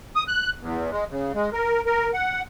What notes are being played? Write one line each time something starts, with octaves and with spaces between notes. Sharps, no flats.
D#6
F#6
E2
G#3
C#3
G#3
A#4
A#4
F#5